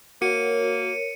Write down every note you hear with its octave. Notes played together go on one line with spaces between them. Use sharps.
A#3 F#4 A#4 C#5 C#7 D#7